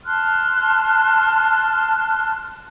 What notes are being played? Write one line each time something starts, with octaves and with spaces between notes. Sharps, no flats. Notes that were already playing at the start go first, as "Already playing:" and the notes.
A5 C6 F6 F#6